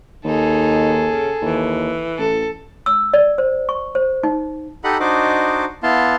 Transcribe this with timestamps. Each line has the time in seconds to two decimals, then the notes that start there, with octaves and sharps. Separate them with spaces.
0.25 D#2 D#4 G#4 A4
1.10 C#3
1.42 D#2 E3
2.18 A1 A4
2.86 E6
3.14 D5
3.38 C5
3.69 C#6
3.95 C5
4.23 D#4
4.84 D#4 G4 A4 D#5 F#5 B5
5.00 D4 D#4 F#4 C5 D#5 D6
5.83 B3 E4 F5 A5 C6